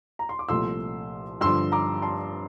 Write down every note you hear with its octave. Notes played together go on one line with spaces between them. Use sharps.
A#5
C6
D6
C2 A#2 F3 A3 C6 E6
G2 D3 F3 C6 E6
A#5 D6
A5 C6